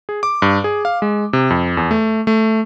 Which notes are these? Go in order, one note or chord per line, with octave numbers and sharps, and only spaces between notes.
G#4
D6
G2
G#4
F5
G#3
C3
F2
E2
A3
A3